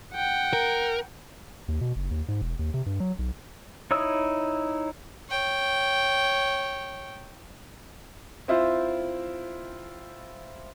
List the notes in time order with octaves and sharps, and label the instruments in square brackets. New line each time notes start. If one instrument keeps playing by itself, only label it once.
[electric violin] F#5 G5
[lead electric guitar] A#4
[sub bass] D#2
B2
F#1
D#2
G#2
E1
D#2
C3
G2
F#3
B1
[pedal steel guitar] D#4 E4 C#5 D#6 E6
[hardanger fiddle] C#5 G5
[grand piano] C4 E4 F4 C5